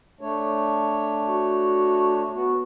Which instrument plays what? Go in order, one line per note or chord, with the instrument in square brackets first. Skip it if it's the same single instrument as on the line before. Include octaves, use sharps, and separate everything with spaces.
[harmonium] A3 D4 C#5
[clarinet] F#4
[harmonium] B3 [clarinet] F#4